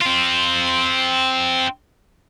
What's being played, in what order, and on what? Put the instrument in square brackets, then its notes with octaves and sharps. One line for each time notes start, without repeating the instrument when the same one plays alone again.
[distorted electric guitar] C4 F4